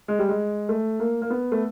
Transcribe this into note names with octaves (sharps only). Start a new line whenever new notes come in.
G#3
G3
G#3
A3
A#3
A#3
B3
A3